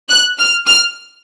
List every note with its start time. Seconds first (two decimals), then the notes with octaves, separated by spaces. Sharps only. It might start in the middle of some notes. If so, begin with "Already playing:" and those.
0.09 F#6
0.38 F6
0.67 F6